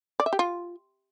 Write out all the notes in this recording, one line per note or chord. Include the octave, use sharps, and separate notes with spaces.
D5
E5
G4
F4